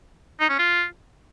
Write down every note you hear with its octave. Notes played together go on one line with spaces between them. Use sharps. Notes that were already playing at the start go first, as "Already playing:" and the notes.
D#4
C#4
F4